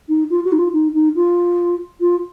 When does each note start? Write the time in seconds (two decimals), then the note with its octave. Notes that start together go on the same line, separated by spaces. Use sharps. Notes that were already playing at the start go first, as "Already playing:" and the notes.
0.08 D#4
0.30 F4
0.44 F#4
0.52 D#4
0.58 F4
0.73 D#4
0.94 D#4
1.15 F4
2.00 F4